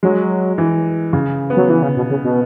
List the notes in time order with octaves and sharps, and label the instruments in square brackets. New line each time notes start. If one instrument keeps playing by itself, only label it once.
[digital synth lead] F#3 [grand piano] G#3
[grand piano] E3
C#3
B3
[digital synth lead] F#3
E3
C#3
B2
C#3
B2